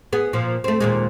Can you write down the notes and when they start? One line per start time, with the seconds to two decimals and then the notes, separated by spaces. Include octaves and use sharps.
0.13 B3 G#4
0.33 A#2 F3
0.64 A3 C4
0.80 D#2 A#2 G#3